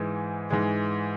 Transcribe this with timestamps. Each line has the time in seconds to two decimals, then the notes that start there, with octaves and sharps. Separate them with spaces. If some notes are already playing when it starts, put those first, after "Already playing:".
Already playing: G#2 E3 G#3
0.50 G#2 E3 G#3